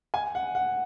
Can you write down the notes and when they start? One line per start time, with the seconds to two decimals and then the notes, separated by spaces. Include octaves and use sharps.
0.14 G#5
0.35 F#5
0.55 F#5